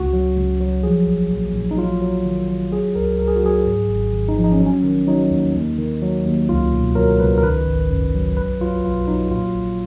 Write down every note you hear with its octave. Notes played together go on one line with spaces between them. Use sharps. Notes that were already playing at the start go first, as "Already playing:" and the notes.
Already playing: C#2 F#4
F#3
C#2
F#3
F3 G#4
A#1
A#1
A#1
D#4
F#3 F4
F#3
D#3
F#3
F#3 G#4
C#2 A#4
C#2 A#4
G#4
F#4
F#3 G#4
G#2
G#1
G#1
D#4
F3
D#4
C#4
F#3
C#4
D#3
F#3 D#4
D#2
D#2
D#3
F#3
D#2
C#2 F4
B2
F#3 A#4
C#2 B4
A#4
D#3 B4
G#1
F#2
F#3
B1 B4
F#3 F4
B1 F4
F#3 D#4
F#4
A#2 F4
A#1